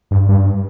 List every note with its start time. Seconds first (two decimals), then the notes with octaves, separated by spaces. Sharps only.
0.11 G2
0.29 G2